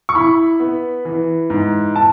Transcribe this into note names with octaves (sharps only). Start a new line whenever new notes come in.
C#6
E4 B5
B3
E3
G#2
A5